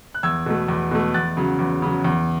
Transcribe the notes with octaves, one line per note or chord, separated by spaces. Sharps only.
F#6
E2 E6 G#6
B2 A3
E2
B2 A3
E2 F#6 A6
C#3 F#3
E2
C#3 F#3
E2